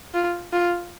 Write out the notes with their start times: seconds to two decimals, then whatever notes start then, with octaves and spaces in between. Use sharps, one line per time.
0.14 F4
0.53 F4